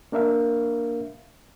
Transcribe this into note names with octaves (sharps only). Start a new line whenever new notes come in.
A#3 D4 A#4 E5 F5